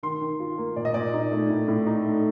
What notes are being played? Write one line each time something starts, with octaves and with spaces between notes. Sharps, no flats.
D#3 C6
D#3
F4
A#3
A#2 D5
D#5
A#2 D5
D#4
A3
A2
A2
D#4
A3